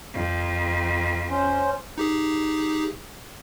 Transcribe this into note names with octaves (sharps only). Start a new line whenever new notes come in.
F2
C#4 C5
D#4 G4 G#4